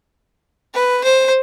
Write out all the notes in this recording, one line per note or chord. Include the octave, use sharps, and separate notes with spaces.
B4
C5